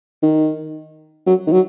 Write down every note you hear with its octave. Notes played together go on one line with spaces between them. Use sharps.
D#3
F#3
D#3
F#3